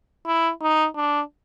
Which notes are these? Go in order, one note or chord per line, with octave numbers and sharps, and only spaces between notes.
E4
D#4
D4